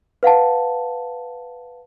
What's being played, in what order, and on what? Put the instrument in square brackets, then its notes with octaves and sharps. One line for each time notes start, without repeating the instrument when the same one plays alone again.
[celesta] B4 F5 F#5 A5